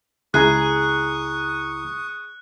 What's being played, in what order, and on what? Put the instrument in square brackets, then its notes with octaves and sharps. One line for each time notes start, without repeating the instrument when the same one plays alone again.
[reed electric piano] C#2 E4 A#5 [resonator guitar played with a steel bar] G#4 [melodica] C#6 D#6 [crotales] F#6